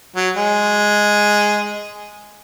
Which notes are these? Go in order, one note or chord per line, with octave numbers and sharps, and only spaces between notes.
F#3
G#3